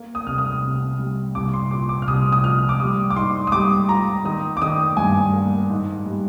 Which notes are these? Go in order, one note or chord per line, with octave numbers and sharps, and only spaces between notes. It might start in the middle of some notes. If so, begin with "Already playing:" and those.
Already playing: A#3
D#6
C2 F6
D#6
C3
G3
C2 D6
C6
A#2 D6
D6
F6
C2 D#6
D#6
F3 F6
D6
G3 D#6
D6
G#2 C6
D#6
G3 D6
F4 A#5
D#3 D#6
D6
D#3 D#6
G2 G#5
A#3
G#2
G3